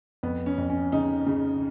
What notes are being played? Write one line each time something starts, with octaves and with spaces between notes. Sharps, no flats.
F2 B3
C#4
F2
C#4
C#3 D#4
C#3